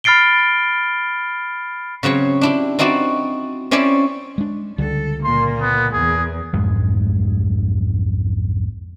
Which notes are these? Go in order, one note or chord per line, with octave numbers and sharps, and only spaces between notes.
B5 F6 A6 C7 D7 G7
C#3 F#3 C4 C#5
D4 E4 G4
C4 D#4 E4 F#4 D5
C4 C#4 E4 C#5 D5 E5
G#3 D4
C#2 D3 G3 A4
A#2 A#3 C6
B3
E2 G#4
B1 F2 G#2 G#3